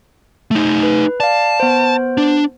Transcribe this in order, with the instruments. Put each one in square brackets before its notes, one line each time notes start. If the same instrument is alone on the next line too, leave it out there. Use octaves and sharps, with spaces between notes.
[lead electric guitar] A3 D#4
[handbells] B4
[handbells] D5 F5 [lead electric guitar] A5
[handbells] B3 C5
[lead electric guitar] D4